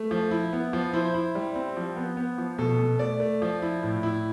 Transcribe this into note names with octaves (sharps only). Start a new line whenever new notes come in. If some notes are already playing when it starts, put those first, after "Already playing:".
Already playing: A3
F3
E4
B3
F3
E4 C5
E4
G3
C4
F3
B3
B3
F3
B2 A4
B2
A3 D5
A3
F3
E4
A2
E4